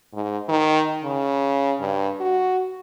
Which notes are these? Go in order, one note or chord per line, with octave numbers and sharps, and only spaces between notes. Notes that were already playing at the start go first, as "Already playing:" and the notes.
G#2
D#3
C#3
G2
F#4